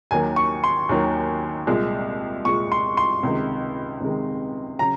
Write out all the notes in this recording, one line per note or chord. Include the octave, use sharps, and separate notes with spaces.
D#2 D#3 F#3 A#3 G#5
C#6
C6
D#2 D#3 F#3 A#3
C2 A#2 G#3
C2 A#2 G#3 C#6
C6
C6
C#2 C3 D#3 G#3
C#2 C3 D#3 G#3
C#3 F#3 A#5